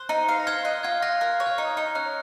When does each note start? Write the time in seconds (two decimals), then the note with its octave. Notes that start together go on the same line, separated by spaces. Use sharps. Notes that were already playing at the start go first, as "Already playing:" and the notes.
Already playing: C5 F#6
0.09 D#4
0.24 C#7
0.29 F5 C7
0.40 A#6
0.47 C5 F6 G#6
0.65 D#5 F#6
0.83 F4 F6 G#6
1.02 F4 F#6 A#6
1.21 A#4 F6 G#6
1.40 C#5
1.46 F6 G#6
1.58 D#4
1.64 D#6
1.71 F6
1.77 D#4
1.95 C#4 F#6